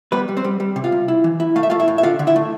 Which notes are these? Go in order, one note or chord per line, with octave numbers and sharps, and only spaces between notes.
G3 B3 B4
G3
C4 C5
G3
G3
C3
F4 F5
C3
E4
E3
E4
A3 F5
E5
A3 F4 F5
E4 E5
A2
E5
D3 F4 F5
D3
E4 E5
A3